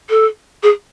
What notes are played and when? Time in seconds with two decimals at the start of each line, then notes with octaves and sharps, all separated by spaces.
0.10 A4
0.63 G#4